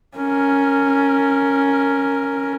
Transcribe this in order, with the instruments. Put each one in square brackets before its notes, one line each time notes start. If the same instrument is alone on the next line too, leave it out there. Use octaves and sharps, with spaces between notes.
[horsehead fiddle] C#4 A#4